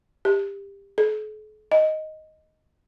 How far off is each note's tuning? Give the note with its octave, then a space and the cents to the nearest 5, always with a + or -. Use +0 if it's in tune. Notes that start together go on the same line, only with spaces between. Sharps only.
G4 +20
A4 -45
D#5 +5